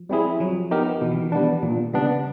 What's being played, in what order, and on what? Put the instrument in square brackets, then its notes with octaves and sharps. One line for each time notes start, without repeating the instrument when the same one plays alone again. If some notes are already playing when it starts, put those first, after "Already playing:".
Already playing: [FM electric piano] F3
[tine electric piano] G3 C4 E4 G#4
[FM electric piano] F3 [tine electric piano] F#3
[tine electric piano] B3 D#4 G4 A#4
[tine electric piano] B2 [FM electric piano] E3
[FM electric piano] D#3
E3
[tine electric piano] G3 B3 D4
[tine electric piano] A#2 [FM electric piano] D#3
[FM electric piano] C#3 [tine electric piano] G3 B3 D4